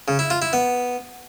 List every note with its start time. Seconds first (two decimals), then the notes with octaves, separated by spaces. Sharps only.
0.08 C#3
0.19 E4
0.30 F4
0.42 E4
0.53 B3